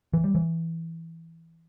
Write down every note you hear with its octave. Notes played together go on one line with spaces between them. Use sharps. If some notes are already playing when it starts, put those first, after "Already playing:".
E3
G3
E3